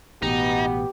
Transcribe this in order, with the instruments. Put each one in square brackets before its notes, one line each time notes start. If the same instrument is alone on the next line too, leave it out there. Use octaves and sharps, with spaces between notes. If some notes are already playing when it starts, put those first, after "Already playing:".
[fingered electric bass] A1 B2 [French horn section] B3 [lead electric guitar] D#4 [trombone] G4